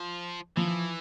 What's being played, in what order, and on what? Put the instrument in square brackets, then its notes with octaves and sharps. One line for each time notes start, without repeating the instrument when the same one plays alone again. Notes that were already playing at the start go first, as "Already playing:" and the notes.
Already playing: [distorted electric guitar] F3
[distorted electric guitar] E3 [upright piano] F3